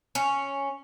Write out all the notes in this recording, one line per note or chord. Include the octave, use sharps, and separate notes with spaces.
C#4